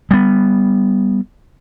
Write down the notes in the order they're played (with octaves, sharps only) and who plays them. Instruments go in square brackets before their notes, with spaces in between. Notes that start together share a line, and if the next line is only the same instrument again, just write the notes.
[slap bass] G3 B3